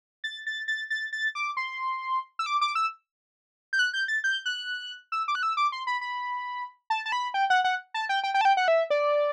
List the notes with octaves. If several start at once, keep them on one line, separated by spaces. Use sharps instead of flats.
A6
A6
A6
A6
A6
D6
C6
E6
D6
D6
E6
G6
F#6
G6
A6
G6
F#6
E6
D6
F#6
E6
D6
C6
B5
B5
A5
A5
B5
G5
F#5
F#5
A5
G5
G5
G5
A5
G5
F#5
E5
D5